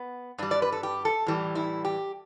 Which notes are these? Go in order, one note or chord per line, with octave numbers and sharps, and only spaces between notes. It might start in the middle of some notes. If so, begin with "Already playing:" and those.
Already playing: B3
G2 G3 D4
D5
B4
A4
G4
A4
A2 E3 G3
E4
G4